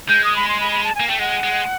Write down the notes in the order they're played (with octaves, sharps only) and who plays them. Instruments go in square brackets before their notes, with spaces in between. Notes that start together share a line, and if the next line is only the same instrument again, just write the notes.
[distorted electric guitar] G#3 [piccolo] G6
[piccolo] D#6
B5
C6
B5
B5
A5
[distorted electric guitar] A#3 [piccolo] G#5
[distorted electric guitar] A3 [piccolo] G5
[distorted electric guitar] G#3 [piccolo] F#5
[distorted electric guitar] G#3